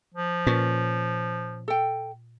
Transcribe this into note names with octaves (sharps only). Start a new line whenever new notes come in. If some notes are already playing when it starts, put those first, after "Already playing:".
F3
A#2 C#4 B4
A4 G5